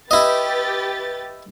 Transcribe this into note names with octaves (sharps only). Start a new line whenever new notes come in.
E4 G4 B4 D#5 A6